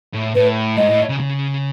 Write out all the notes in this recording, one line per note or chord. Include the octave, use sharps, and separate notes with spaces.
A2
A2 B4
G#2 D#5
A2
C#3
C#3